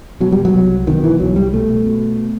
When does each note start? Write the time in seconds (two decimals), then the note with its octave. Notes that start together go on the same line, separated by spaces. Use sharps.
0.20 B2 F#3
0.32 G3
0.45 F#3
0.53 C2
0.87 B2 D#3
1.04 E3
1.20 C2 F#3
1.36 G3
1.53 B2 A3
1.86 B2